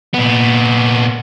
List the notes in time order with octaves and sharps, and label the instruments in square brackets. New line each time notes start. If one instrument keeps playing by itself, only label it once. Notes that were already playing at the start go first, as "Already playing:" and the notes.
[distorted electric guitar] A#2 B3